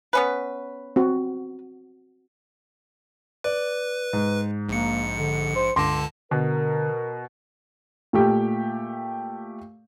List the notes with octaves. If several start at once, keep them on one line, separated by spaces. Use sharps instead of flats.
B3 C#4 B4
C4 F#4
B4 D5
G#2
A#1 A#3 C#7
D3
C5
C#2 G2 D3 A5 C6 D6 A#6
B2 D3 A#4
A#2 A3 G4